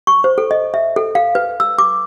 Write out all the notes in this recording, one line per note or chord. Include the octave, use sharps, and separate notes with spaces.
C#6
C5
A4
D#5
E5
A4
F5
B4
E6
D6